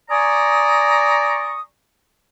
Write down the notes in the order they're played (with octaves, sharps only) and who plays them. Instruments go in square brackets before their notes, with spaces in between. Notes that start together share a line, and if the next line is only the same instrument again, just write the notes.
[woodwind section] D5 G#5 A#5 C#6 D#6